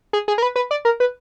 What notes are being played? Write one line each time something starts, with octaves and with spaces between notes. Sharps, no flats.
G#4
G#4
A#4
B4
B4
D5
A#4
B4